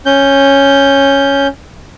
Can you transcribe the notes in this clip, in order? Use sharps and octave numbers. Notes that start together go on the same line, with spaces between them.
C#4 G6